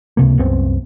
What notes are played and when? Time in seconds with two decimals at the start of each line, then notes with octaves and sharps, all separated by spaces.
0.17 C#2 C3 A#3
0.38 C2 F#2 B3 C4